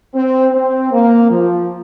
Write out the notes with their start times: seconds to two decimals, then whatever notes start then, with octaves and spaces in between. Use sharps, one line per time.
0.14 C4
0.53 C4
0.92 A#3
1.29 F3